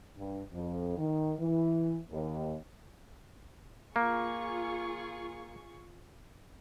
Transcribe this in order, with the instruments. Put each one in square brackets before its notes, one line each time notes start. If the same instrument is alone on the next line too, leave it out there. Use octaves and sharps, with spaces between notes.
[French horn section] G2
F2
D#3
E3
D#2
[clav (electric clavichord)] A#3 [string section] F4 G#4 C#6